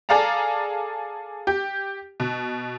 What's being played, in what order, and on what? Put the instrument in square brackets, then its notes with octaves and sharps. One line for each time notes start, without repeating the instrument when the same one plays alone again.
[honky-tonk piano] G#4 A4 D5 F5 A5 A#5
G4
B2